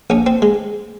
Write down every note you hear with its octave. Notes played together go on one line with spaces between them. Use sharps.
A#1 C#4
C4
G#3